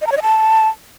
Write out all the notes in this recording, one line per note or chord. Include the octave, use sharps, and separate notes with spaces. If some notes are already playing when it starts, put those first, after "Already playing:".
D#5
A#5
C#5
D#5
A5